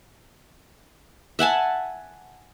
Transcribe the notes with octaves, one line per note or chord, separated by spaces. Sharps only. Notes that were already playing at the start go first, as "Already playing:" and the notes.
E5 F#5 G#5 A5